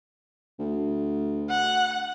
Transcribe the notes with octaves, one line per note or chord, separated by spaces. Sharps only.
D2
F#5